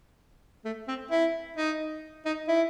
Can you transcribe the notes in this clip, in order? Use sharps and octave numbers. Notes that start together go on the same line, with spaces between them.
A3
C4
E4
D#4
D#4
E4